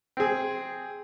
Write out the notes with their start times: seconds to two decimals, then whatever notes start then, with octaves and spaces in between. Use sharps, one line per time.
0.17 C4 G#4